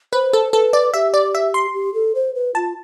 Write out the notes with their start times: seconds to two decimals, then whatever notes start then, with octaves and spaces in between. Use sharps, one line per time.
0.13 B4 C5
0.33 A4
0.53 A4 B4
0.73 D5
0.94 G4 E5
1.14 D5
1.35 E5
1.54 C6
1.74 G4
1.94 A4
2.15 C5
2.35 B4
2.55 F4 A5